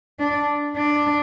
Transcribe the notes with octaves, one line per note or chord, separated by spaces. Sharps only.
D4
D4